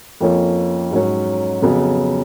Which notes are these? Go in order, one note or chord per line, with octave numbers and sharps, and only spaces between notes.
F2 F3 A#3 C#4
G#2 F#3 C#4
F2 C#3 F#3 B3